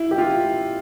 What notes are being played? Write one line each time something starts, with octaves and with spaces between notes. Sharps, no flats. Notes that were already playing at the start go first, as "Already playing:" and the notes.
Already playing: E4
G4
F4